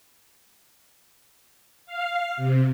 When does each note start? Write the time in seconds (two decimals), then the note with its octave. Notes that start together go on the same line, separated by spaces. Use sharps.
1.86 F5
2.37 C3